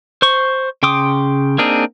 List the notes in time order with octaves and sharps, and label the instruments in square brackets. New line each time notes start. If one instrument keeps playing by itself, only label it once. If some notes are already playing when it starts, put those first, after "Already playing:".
[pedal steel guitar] C5 C#6
C#3 G5 C6 D6 D#6
A#3 C4 D4 D#4 G#4